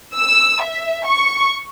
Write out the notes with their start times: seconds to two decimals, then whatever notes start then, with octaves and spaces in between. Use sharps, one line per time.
0.16 E6
0.63 E5
1.08 C#6